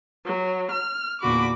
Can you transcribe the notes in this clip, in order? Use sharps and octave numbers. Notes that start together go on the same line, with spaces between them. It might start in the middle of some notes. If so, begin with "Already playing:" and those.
F#3
F6
E2 A#2 D3 F#4 B5 D6